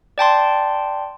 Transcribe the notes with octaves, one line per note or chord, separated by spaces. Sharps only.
D5 G5 A5 C6